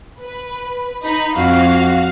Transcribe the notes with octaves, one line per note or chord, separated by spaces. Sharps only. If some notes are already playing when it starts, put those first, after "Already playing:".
B4
D#4 B5
F2 F#4 F5